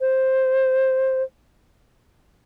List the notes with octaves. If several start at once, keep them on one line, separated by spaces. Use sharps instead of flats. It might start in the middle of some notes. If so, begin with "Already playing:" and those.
C5